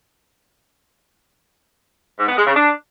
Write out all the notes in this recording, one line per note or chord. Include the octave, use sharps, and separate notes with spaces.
G#2
B3
G#3
C#3
D4